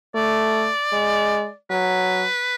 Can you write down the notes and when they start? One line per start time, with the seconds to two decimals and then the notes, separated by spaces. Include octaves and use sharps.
0.15 A3 D5
0.93 G#3
1.70 F#3 B4